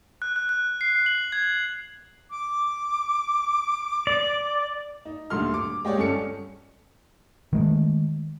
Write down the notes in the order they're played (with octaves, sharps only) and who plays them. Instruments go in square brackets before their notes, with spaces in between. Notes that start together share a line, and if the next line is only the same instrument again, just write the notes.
[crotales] F#6
F#6
F#6
C7
F#7
G#6
[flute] D6
[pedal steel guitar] D5
[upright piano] D#4
D#1 D3 A3 C6 F6
D6
G#3 G4 C#5 D5
G1 C#4 A4 C#7
[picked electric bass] D#3 G#3 A3